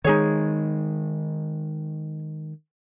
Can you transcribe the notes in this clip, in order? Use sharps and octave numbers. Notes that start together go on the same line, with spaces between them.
D#3 G#3 D#4 G#4 C#5